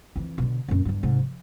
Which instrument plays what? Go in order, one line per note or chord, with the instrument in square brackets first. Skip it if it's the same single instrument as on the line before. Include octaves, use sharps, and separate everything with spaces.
[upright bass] F2 E3
B2 D3
F#2 A#2
E2 G2
G#2 C3
F3